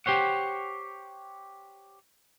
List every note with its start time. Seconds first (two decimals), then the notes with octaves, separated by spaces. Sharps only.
0.06 G4 C5 C#5 F#5